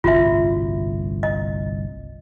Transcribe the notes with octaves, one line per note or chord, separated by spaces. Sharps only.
G1 C2 A2 F4 F#4 E5
D#5